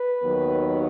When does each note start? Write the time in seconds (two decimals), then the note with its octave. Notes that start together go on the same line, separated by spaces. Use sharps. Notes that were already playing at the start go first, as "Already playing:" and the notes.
Already playing: B4
0.22 D#2 D#3 F#3 B3